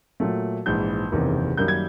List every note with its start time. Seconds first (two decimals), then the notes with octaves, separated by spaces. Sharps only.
0.20 A#2 F#3 A3
0.66 A#1 G#2 E3 G6
1.12 F#1 E2 C3 D#3
1.57 F#2 D#3 G3 A#3 G6
1.68 G#6